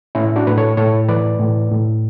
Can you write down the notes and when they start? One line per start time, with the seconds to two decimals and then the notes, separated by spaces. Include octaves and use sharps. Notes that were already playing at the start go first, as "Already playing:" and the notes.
0.15 A2 C#4 E4
0.36 D4 F#4
0.47 A2 B4
0.58 A4 C#5
0.77 A2 A4 C#5
1.09 E3 B4 D5
1.40 A2
1.72 A2